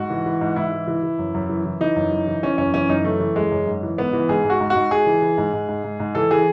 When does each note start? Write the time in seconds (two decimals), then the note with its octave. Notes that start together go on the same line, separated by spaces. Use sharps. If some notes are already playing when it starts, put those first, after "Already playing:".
Already playing: G#2 F#4
0.10 E3
0.26 E3
0.41 G#2
0.56 G#2 E4
0.72 E3
0.88 E3
1.03 E3
1.19 F#2
1.34 F#2
1.49 E3
1.66 E3
1.80 E3 D#4
1.96 F#2
2.12 E3
2.27 E3
2.43 E3 C#4
2.58 F#2 C#4
2.74 E3 C#4
2.89 F#2 D#4
3.04 E3 A3
3.20 E3
3.36 F#2 G#3
3.51 F#2
3.67 G#2
3.83 E3
3.98 G#2 B3
4.13 E3
4.29 G#2 G#4
4.44 G#2
4.50 F#4
4.60 G#2
4.70 F#4
4.75 G#2
4.90 G#2 G#4
5.06 E3
5.22 E3
5.38 G#2
5.53 G#2
5.68 G#2
5.84 G#2
6.00 G#2
6.15 E3 A4
6.31 E3 G#4